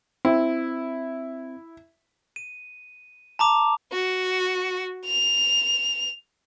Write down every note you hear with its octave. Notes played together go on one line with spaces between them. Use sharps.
C4 E4
D#7
A5 A#5 D6
F#4
F7